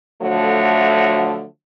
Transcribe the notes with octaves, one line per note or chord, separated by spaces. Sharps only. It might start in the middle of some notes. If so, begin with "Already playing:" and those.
D3 F3 F#3 A3